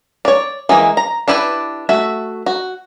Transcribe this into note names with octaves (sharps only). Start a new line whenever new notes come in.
C#5 D5
E3 G#3 A#3
A#5
D4 E4 G4 B4
A3 F#4 E5
F#4